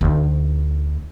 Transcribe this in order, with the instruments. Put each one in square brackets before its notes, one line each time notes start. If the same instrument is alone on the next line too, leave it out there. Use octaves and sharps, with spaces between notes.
[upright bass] D2 D#4